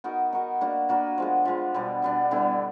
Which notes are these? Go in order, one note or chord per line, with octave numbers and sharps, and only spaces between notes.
B3 D#4 F#4 A#4
B3 D#4 F#4 A#4
A#3 D4 F#4 B4
A#3 D4 F#4 B4
F3 G#3 B3
F3 G#3 B3
B2 G3 B3 D4
B2 G3 B3 D4
D3 G3 B3 E4